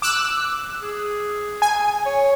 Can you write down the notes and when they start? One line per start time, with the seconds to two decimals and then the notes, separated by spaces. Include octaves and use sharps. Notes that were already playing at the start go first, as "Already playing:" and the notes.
0.02 D6 E6 F#6
0.82 G#4
1.62 G#5
2.06 C#5